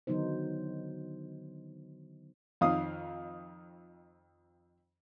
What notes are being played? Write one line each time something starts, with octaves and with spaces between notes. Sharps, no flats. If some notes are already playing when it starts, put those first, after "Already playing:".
D3 D#3 F#3 B3 D#4 C5
F2 D#3 F5 D#6